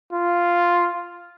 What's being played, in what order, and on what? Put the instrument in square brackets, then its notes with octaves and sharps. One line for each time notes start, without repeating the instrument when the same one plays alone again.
[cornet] F4